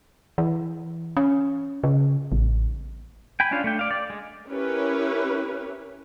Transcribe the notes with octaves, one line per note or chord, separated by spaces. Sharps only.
E3
C#4
C#3
A1
G5 G#5 B5
C#4 D4 F4 F5
A3 D4 G5
D5 F5
D5
G#3
C#4 E4 G4 A#4 B4 C#5